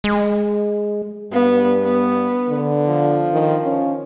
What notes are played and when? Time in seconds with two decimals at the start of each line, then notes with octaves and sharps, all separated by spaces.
0.04 G#3
1.33 G2 B3
1.84 B3
2.49 D3
2.86 F3
3.33 D#3
3.64 C#4